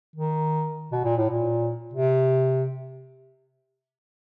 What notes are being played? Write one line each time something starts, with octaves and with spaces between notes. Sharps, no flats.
D#3
B2
A#2
A2
A#2
C3